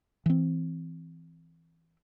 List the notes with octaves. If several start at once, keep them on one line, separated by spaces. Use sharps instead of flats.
E3 C4